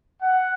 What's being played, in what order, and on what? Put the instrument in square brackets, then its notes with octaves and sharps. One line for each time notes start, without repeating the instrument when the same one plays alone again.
[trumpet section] F#5